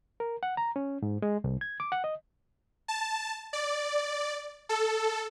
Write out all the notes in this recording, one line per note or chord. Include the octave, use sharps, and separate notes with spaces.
A#4
F#5
A#5
C#4
G#2
G#3
C2
G#6
D6
F#5
D#5
A5
D5
A4